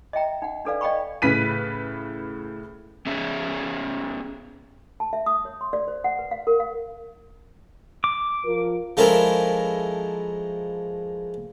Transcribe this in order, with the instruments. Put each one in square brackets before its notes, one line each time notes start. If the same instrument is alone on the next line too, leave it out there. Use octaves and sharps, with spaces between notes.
[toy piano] D#5 E5 G5 A#5
D#4 F#5
D4 D#4 A4 B4 D5 F5
D5 D#5 F5 G5 B5 C#6
[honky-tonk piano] A2 C#3 B4 B6 D#7
[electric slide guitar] B3 C#4 G#4 C#5 E5
[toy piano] A5
E5
D#6
C#5
C6
D5
C5
F#5
B4
F5
A#4
F5
[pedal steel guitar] D6
[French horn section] F3 F4 A#4
[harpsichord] F3 G#3 C#4 E4 A4 A#4